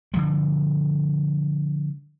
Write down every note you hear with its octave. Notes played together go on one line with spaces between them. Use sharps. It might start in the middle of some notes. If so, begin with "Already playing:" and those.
D3 F3 G3